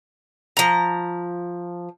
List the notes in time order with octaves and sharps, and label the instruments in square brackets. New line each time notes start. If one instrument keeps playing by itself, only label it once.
[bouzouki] F3 A#5